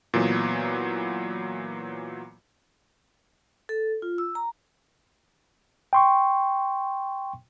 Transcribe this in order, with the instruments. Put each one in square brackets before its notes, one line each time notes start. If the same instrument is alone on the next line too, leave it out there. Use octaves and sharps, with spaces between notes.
[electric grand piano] A#2 E3 F#3 B3
[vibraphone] A4
F4
E6
A#5
[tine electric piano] G5 C6 C#6